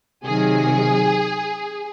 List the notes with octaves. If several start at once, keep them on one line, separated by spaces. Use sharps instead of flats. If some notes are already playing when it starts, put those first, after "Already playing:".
C3 D#3 F#3 G#4